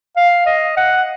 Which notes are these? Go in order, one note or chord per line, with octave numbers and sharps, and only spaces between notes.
F5
D#5
F#5